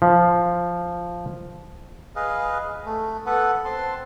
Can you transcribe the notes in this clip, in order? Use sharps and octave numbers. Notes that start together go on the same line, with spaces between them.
F3
G#4 B4 D#5 F5
A3
B3 A4 B4 F#5
C4 A5 C6